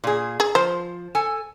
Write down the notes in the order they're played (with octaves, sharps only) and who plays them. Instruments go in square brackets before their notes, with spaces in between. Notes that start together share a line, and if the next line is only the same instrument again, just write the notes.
[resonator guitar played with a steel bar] A#2 G#4
[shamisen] G#4
[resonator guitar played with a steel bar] F3 [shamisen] C5
[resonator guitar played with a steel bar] A4 G#5